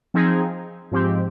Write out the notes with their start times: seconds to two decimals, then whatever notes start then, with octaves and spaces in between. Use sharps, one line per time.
0.14 F3 C4 D#4 G#4
0.92 G#2 F3 C4 G4